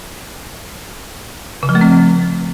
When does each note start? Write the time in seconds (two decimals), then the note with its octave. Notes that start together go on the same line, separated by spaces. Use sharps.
1.63 C#3
1.69 F3
1.75 A3
1.81 C4